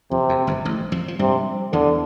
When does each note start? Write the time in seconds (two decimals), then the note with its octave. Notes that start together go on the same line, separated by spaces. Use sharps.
0.11 F2 C3
0.29 F2
0.47 G1 G2
0.65 A1 A2
0.92 F2 F3
1.08 F3
1.19 G2 C3 G3
1.73 E2 D3 E3